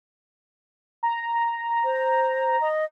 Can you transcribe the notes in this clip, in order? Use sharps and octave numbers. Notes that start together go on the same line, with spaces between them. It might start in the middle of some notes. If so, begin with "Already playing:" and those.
A#5
C5
D#5